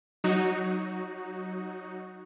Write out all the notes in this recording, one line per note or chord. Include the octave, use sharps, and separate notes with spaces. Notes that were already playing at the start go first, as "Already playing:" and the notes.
F#3 D#4 F#4